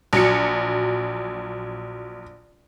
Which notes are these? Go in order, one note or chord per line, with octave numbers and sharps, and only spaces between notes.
A#1 F#3 C#7